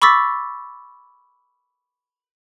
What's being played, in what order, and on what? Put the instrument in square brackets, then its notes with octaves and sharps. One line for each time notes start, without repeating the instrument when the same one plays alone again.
[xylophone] B5 C#6 D6 E6 A6 B6